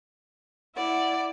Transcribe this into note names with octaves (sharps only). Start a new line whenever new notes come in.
E4 D5 F#5